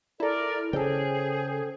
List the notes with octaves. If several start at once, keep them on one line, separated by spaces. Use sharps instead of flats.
E4 A4 A#4 D5
C#3 G#4 A4 C5 G5